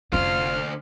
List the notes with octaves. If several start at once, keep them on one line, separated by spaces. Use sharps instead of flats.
F1 D2 C#4 F4 C5 F6